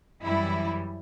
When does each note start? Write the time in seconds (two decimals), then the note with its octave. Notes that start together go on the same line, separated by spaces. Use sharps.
0.22 F#2 E3 G3 E4